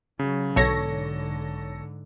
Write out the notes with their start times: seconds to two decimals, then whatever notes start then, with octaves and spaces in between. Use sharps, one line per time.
0.19 C#3 F#3
0.56 B1 G#2 D3 A4 C#5 A#6